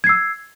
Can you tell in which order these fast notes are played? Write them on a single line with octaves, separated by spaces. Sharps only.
G#6 C7 E6